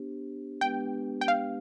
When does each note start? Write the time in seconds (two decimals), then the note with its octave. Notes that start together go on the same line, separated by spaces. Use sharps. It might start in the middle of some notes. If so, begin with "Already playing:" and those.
Already playing: B3 D4 G4 C5
0.61 G#3 B3 D4 G4 B4 G5
1.21 G5
1.28 F5